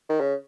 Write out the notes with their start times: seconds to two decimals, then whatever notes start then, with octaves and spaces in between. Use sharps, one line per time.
0.09 D#3
0.20 C#3